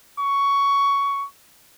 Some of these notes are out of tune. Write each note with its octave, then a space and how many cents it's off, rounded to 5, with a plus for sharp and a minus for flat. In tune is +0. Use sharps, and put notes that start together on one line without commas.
C#6 +15